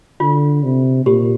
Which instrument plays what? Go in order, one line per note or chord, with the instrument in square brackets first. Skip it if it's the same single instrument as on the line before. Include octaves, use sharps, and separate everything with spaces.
[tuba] D3 [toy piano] F4
[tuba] C3
[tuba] A#2 [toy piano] G4